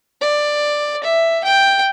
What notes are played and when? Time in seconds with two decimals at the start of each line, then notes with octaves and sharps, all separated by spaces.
0.21 D5
1.03 E5
1.44 G5